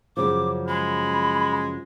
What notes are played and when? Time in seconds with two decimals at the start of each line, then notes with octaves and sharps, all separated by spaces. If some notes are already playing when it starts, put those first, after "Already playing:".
0.17 F#2 C#3 F3 D6
0.68 G#3 B5